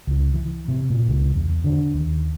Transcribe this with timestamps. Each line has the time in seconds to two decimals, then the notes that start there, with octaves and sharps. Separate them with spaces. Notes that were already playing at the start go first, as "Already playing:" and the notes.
0.07 C#2
0.34 E3
0.68 C3
0.90 A#2
1.08 C#2
1.35 E2
1.64 D3
1.94 D#2